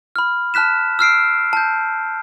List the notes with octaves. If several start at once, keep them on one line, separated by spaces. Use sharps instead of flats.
B5 F6
A5 F6 F#6 B6 E7
E6 F6 C7 D7
A5 G6